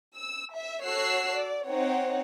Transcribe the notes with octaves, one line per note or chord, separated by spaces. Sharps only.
E6
E5
F#4 A4 C#5 E6 F#6 C7
D5
C4 D#4 C#5 F#5